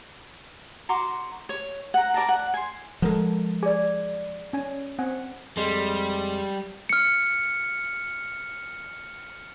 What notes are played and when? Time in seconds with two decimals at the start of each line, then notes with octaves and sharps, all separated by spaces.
0.89 F#4 A#5 C6 D6
1.49 C#5
1.94 F#5 A#5
2.14 A#4 D5 A5 A#5
2.29 F#5
2.54 G#5 C6
3.02 F3 G#3 A4 A#4 F#5
3.63 G#4 D5 G#5
4.53 C#4 G#5
4.99 C4 F#5 G#5
5.57 F2 G3 G#3 C6
6.89 F6 C#7